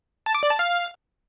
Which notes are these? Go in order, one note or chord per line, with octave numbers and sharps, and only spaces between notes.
A5
D6
D5
A5
F5